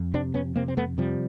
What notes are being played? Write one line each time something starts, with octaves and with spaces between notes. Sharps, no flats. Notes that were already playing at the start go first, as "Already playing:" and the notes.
Already playing: F2
C3 C4 D4
F2 B3 C#4
C3 A#3 C4
C4
F2 A3 B3
C3 F3 G3